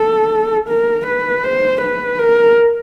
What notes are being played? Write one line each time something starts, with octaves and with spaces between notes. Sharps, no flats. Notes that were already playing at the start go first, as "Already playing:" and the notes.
Already playing: A4
A#4
B4
C5
B4
A#4